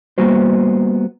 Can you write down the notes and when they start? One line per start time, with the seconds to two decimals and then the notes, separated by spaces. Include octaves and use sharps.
0.18 G3 A#3 B3 F#4 C5